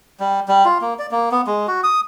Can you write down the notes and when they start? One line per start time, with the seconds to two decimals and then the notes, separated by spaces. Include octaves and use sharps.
0.20 G3
0.48 G3
0.65 F4
0.81 A#3
0.99 D5
1.11 A#3
1.32 B3
1.47 G#3
1.67 F#4
1.84 D#6